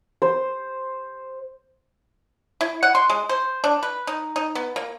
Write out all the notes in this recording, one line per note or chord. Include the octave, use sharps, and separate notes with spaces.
C5
E4
F#5
C6
G#3
C5
D4
B4
D#4
D#4
B3
A#3